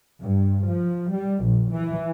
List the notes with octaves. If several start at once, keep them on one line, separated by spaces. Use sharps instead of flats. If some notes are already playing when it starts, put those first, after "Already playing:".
G2
F3
G3
A#1
E3